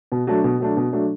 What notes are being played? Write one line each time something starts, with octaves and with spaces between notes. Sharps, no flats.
B2
F#3 A3 D4
B2
F#3 A3 D4
B2
F#3 A3 D4